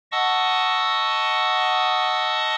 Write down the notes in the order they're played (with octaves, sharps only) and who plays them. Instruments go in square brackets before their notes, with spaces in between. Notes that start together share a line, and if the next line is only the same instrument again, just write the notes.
[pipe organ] D#5 F#5 A5 C#6 D#6 E6